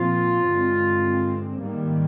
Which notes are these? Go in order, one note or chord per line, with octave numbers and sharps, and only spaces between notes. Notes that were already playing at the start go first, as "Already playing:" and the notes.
Already playing: A#2 F3 C4 F4
G2 D3 G#3 C4
G#2 D#3 G3 A#3